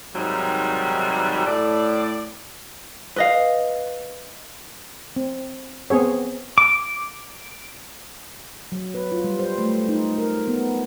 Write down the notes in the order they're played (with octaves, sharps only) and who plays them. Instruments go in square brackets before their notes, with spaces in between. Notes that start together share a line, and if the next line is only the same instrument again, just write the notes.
[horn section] G#2 C3 D#3 F#3 G3
A2 D5
[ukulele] B4 D#5 F5
[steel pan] C4
B3 C4 G#4 C#5
[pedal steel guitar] D6
[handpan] F#3
B4
F4
G3
C5
A3
D#4
A#4
B3